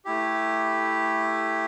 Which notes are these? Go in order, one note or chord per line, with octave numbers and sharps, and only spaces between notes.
A3 E4 G4